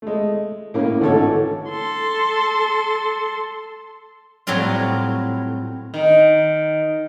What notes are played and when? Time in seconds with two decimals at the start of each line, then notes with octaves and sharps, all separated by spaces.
0.02 G#3 A3
0.74 A2 A#3 C#4
1.00 G#1 D3 E3 A3 A4 C#5
1.71 A4 C6
4.47 A2 F#3 G3 C4 F4
5.94 D#3